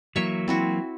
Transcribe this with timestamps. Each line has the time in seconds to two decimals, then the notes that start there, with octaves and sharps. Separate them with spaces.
0.16 E3 F#3 A#3 C#5 E5 C#6
0.48 C4 E4 F#4